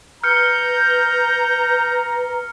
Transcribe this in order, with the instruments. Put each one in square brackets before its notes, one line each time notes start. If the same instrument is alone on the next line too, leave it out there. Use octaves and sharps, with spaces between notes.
[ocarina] B4 [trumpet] A#5 [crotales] F6 C#7 [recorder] G6